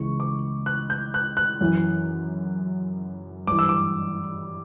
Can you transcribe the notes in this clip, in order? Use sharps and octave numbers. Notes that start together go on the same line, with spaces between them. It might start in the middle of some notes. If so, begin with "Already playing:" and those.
Already playing: C#2 C#3 E3 C#6
D6
F#6
G6
F#6
F#6
F#2 E3
G2 E3 D6
E6
D6